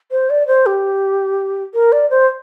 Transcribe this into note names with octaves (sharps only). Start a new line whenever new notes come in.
C5
D5
C5
G4
A#4
D5
C5